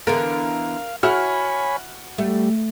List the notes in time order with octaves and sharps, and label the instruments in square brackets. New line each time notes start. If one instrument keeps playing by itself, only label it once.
[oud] D3 E3 B3 [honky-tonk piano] A#4 [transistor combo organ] F5
[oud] E4 [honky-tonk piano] F#4 F6 [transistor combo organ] C#5 G#5 B5
[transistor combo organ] G3 [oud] A3